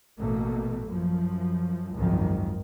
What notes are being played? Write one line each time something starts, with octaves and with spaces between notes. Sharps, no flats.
A1 B2 A3 A#3
F#2 F3
G#1 C#2 F#2 D#3 F3